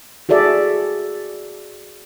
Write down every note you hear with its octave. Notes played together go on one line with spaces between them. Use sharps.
F#4 G#4 A4 D5 E5